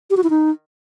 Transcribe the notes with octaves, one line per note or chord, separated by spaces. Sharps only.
G4
F#4
E4
D#4